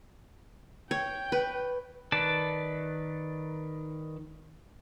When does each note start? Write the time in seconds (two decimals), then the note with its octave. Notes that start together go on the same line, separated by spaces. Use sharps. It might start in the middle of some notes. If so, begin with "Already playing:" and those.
0.91 C#5 G5
1.32 B4
2.12 D#3 B4 D5 A5